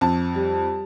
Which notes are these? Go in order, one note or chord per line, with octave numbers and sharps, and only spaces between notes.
F2 A5
G3